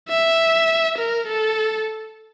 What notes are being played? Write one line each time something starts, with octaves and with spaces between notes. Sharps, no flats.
E5
A#4
A4